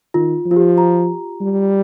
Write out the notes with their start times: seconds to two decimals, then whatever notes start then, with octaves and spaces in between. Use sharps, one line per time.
0.14 D#3 F4
0.46 F3 F4
0.56 G4
0.78 A#5
1.41 G3